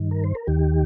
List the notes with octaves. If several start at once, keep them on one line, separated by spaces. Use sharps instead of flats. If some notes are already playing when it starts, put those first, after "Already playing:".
Already playing: G2 D#3
A#4
C5
A#4
D#2 D#3 G4